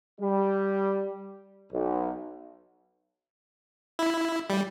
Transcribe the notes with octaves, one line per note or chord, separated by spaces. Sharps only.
G3
B1
E4
G3